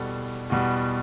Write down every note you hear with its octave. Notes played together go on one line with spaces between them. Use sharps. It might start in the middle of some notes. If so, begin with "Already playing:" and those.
Already playing: E2 B2 G3 A4
E2 B2 G3